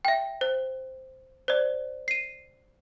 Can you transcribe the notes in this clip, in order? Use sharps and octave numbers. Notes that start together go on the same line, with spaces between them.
E5 G5
C5
C5 D5
C7 D#7